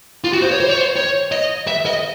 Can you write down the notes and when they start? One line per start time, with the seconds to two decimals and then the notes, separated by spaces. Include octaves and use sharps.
0.24 F4
0.33 F#4
0.42 C5
0.51 C#5
0.60 C5
0.69 C#5
0.78 C5
0.96 C#5
1.32 D#5
1.67 E5
1.86 D#5